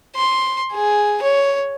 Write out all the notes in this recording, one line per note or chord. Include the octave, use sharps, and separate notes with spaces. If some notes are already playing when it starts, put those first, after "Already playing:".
C6
G#4
C#5